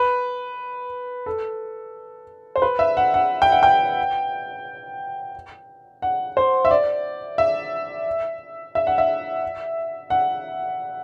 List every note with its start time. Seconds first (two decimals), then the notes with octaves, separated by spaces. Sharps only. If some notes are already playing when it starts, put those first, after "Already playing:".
Already playing: B4
1.26 A4
2.56 C5
2.62 B4
2.79 E5
2.97 F#5
3.14 F#5
3.42 G5
3.52 F#5
3.63 G5
6.02 F#5
6.37 C5
6.65 E5
6.71 D5
7.38 E5
8.75 E5
8.87 F#5
8.98 E5
10.10 F#5